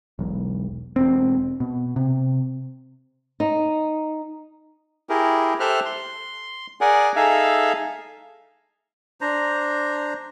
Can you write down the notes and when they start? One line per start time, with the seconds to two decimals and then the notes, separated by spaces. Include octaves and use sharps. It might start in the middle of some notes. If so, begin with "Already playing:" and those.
0.19 E1 B1
0.96 E1 C4
1.60 B2
1.96 C3
3.40 D#4
5.09 E4 G4 G#4 A#4
5.60 G4 A4 C5 E5 F6 F#6
5.85 C6
6.81 G#4 A#4 D5 F#5 G#5
7.16 D#4 G#4 A4 E5 F5
9.21 D4 C5 A#5